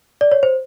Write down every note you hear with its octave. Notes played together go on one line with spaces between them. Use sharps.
D5
C#5
C5